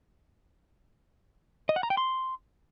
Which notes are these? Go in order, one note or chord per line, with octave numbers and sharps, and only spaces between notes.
D#5
F#5
A#5
G5
C6